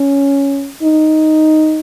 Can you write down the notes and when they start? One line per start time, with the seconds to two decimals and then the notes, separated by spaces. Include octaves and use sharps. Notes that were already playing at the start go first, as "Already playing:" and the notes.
Already playing: C#4
0.83 D#4